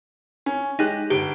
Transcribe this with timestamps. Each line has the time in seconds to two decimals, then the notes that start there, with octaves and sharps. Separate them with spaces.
0.46 C#4
0.79 G#3 D#4 G4 F#6
1.10 G1 G4 D7